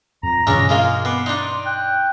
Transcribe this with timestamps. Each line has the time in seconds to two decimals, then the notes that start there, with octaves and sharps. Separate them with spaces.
0.23 F2 A#5 A#6
0.47 C#2 G2 B2 E3 C#4 D4
0.69 G#3 A#3 F4 D#5 F6
1.05 B3 D6 C7
1.26 D4 D#4 D5 C6
1.65 G5 F#6